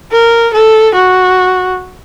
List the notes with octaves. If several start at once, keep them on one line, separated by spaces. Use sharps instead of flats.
A#4
A4
F#4